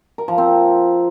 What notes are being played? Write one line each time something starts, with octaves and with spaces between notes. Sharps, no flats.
A#4
F3
C4